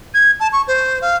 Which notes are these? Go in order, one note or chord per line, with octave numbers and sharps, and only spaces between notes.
G#6
A5
C#6
C5
F5